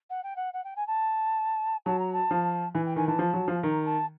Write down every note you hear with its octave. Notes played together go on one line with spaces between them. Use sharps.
F#5
G5
F#5
F#5
G5
G#5
A5
F#3 A5
A#5
A5
F3
E3 G#5
G5
D#3 G#5
E3 A5
F3
F#3
F3
D#3 A#5
A5